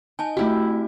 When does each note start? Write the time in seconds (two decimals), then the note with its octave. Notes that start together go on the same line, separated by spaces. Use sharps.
0.19 D#4 G#5 A5
0.37 A3 C4 E4 F#4 G4